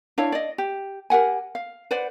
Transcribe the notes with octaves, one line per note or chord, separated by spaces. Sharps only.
D4 E4 C#5 F5
D5 D#5
G4
G4 A#4 F#5 G#5
F5
B4 C5 D5 F#5